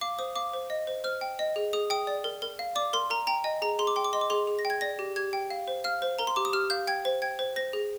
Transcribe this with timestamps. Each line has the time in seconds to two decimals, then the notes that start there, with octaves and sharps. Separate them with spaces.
0.01 F5 D6
0.19 C5 D#6
0.35 F5 D6
0.53 C5
0.70 D#5
0.87 C5
1.04 C5 F6
1.21 G5
1.39 D#5
1.56 G#4
1.73 G#4 D#6
1.90 G5 D#6
2.07 D5
2.24 A#4
2.42 A#4
2.59 F5
2.75 D5 D6
2.93 A#4 C6
3.10 A#4 A#5
3.27 G5 A#5
3.44 D#5 G#5
3.62 G#4 A#5
3.79 G#4 C6
3.87 D6
3.96 G5 C6
4.04 D6
4.13 D#5 C6
4.21 D6
4.30 G#4 C6
4.47 G#4
4.59 A#6
4.65 G5
4.70 G#6
4.81 D5 A#6
4.99 G4
5.16 G4 G#6
5.33 G5
5.50 F5
5.68 C5
5.84 F5 F6
6.02 C5
6.19 A#4 A#5
6.27 C6
6.36 G4 D6
6.45 D#6
6.53 G4 F6
6.70 F5 G6
6.87 G5 G#6
7.05 C5
7.22 G5 G#6
7.39 C5
7.56 C5 A#6
7.73 G#4